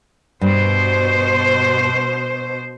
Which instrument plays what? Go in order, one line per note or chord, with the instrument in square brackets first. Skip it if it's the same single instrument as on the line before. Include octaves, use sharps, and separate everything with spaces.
[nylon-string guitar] G2 [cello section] B2 C5